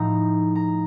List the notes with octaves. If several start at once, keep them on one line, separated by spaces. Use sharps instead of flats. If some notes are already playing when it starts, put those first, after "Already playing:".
Already playing: A2 F3 A3 D#4 A#5
A#5